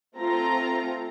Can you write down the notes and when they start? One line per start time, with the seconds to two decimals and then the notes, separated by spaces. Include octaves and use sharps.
0.17 A3 C4 F4 A#5